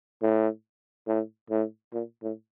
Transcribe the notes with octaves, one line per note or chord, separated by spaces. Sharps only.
A2
A2
A2
A#2
A2